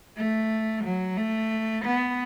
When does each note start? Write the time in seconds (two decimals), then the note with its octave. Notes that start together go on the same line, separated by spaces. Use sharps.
0.17 A3
0.84 F#3
1.17 A3
1.85 B3